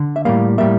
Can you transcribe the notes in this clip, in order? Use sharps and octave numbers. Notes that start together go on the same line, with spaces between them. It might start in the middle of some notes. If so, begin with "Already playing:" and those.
Already playing: D3
E5
A2 G3 A#3 F5
A2 G3 A#3 E5